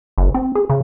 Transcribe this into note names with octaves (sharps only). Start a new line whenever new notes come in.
F#1
C4
G#4
C#3